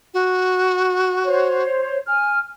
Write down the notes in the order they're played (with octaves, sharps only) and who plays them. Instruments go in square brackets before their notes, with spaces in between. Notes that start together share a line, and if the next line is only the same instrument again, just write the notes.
[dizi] F#4
[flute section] C5 C#5
G#5 F6